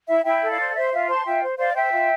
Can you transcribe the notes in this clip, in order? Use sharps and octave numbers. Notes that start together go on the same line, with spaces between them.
E4 E5
E4 E5 G5
A4
D5 F5
C5
C5 E5
F4 E5
C5 A5 C6
F4 E5 G5
C5
C5 D5 F5
C5 E5 G5
F4